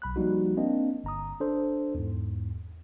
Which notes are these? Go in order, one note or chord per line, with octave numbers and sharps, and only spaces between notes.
B1 B5 F#6
F3 G3 A#3 D#4 F#4
A#3 C4 D4 D#5
G1 A#5 D#6
D4 A4 C5
E2 G#2